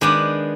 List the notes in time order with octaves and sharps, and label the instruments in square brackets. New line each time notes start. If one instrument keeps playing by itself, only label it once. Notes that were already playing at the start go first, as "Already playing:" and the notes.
[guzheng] D#3 G#3 B3 D4 [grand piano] D6